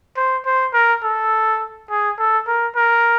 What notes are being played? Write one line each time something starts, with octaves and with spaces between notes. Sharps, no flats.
C5
C5
A#4
A4
G#4
A4
A#4
A#4